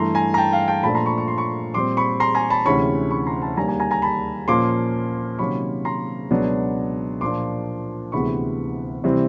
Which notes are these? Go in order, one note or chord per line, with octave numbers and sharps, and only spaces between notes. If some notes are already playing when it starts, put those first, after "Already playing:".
Already playing: G2 E3 A3 A#5 C6
G#5 A#5
A#5
G5 A5
F5 G5
G5 A5
A#2 F3 A3 D4 A5 B5
A#5 C6
B5 C#6
C#6
C6
B5 C#6
A#2 G3 C4 C6 D6
B5 C#6
A#5 C6
G#5 A#5
A5 B5
D2 C3 E3 G#3 C#4 B5 C#6
B5 C#6
A#5 C6
A5 B5
D#2 D3 G3 A#3 D4 G#5 A#5
G#5 A#5
G#5 A#5
G#5 A#5
A5 B5
A#2 F3 A#3 C#4 C6 D6
C3 D#3 F#3 A#3 C#4 B5 C#6
A#5 C6
C#2 B2 F#3 B3 D4
A#2 F3 A#3 D4 C6 D6
D2 C3 E3 G#3 B3 B5 C#6
C3 E3 G3 C4